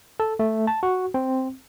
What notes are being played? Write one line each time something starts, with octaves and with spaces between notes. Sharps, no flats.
A4
A3
A5
F#4
C4